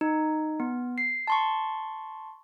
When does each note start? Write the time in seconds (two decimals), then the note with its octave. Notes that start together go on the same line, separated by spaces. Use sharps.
0.01 D#4
0.60 B3
0.98 C7
1.27 A5 C6 C#6